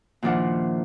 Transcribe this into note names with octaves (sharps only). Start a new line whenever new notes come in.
A#2 D#3 F3 D4 E4 F#5